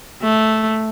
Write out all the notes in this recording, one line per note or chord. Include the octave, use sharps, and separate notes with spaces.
A3